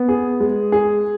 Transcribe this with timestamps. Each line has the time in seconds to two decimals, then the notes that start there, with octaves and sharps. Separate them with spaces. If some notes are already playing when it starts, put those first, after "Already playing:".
Already playing: B3
0.08 G#4
0.40 G#3
0.72 G#4